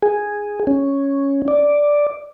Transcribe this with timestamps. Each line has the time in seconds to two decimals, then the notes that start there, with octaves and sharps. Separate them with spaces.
0.03 G#4
0.67 C#4
1.48 D5